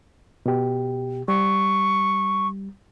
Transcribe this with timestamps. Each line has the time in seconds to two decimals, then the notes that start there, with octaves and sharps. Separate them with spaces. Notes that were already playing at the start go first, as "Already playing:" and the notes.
0.46 B2 G4
1.28 G3 C#6